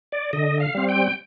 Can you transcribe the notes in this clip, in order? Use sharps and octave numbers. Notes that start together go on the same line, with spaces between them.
D5
D3 D#5
F5
G3 C4
G5